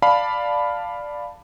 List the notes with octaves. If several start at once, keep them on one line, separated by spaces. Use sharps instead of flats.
D5 F5 A5 B5